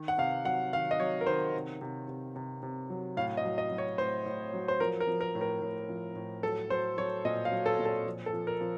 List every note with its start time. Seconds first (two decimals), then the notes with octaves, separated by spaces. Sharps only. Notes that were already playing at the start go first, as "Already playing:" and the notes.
Already playing: D#3
0.08 F#5
0.18 C3 F5
0.45 F#3 F#5
0.72 D#3 F5
0.91 D#5
1.00 F#3 C#5
1.21 A#4
1.26 D#3 C5
1.54 C3
1.81 C3
2.08 C3
2.36 C3
2.63 C3
2.90 F#3
3.17 A2 F5
3.37 D#5
3.45 F#3
3.58 D#5
3.71 F#3
3.78 C#5
3.98 A2 C5
4.26 A2
4.54 F#3
4.68 C5
4.80 F3 A#4
5.00 A#4
5.07 F3
5.21 A#4
5.35 A2
5.41 A#4
5.62 A2
5.89 F3
6.15 A2
6.43 F#3 A4
6.70 F#3 C5
6.97 F#3 C#5
7.25 A#2 D#5
7.45 F5
7.52 F#3
7.66 A4
7.79 A#2
7.85 A4
8.06 F3
8.26 A4
8.33 F3
8.47 A#4
8.61 F3